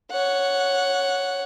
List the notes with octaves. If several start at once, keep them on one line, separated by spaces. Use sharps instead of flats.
C#5 F#5